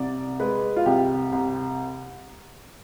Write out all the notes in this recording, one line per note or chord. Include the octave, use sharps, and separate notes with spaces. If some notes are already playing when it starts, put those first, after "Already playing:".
Already playing: C2 D5
G#3 B4
F4
C2 G4
C2